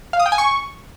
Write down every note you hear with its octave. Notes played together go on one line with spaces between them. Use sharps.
F5
D#6
G5
G#5
C#6